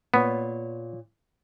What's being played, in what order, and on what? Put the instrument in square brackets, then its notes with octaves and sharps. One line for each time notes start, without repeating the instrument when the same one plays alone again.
[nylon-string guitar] A#2 C#5 [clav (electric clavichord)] B3